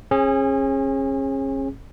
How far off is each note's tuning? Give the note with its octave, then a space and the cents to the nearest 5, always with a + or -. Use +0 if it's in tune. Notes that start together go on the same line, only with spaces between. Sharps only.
C#4 -35 G#4 -10